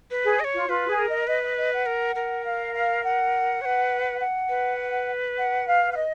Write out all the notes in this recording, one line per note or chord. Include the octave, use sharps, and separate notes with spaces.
B4
G#4
D#5
C#5
F4
F4 B4
G#4
A#4
D#5
B4 D#5
D#5
D#5
F#5
A#4
A#4
F5
F5
F#5
C#5
B4
F#5
B4
F#5
F5
F5
D#5